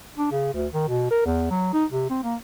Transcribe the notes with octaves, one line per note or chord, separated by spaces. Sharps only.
D4
C#3
D2
D#3
B2
A#4
E2
F#3
D#4
C3
C4
A#3